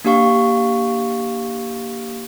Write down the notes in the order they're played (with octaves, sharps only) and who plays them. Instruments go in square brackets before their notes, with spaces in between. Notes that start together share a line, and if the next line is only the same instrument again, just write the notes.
[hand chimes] A#3 D4 G4 F5 C#6